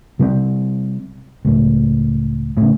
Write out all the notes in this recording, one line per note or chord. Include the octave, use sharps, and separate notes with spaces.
C3 G3 G#3 C4
C#2 A2
A2 C#3